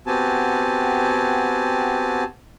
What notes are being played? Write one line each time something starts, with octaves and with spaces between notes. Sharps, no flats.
B3 C4 F#4 G4 G#5 A5